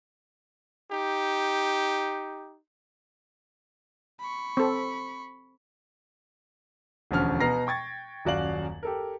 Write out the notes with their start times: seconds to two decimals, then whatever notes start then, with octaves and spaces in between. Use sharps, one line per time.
0.91 D#4 G4
4.20 B5 C#6
4.57 C4 A4
7.11 E1 D2 F3 C#4 F6
7.40 B2 B3 A#5 F6 A#6 C7
7.67 G5 C#6 G#6 A6
8.25 D#1 F#2 F#4 D5 F5 F#7
8.83 G4 A4 A#4